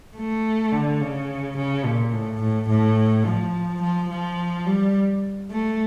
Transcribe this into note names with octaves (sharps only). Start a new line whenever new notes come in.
A3
D3
C#3
C#3
A#2
A2
A2
A2
F3
F3
F3
G3
A3